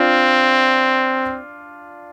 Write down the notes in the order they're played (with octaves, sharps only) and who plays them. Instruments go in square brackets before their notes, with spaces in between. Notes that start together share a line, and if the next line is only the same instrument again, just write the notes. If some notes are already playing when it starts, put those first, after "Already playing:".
Already playing: [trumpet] C4 [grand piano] D4 F4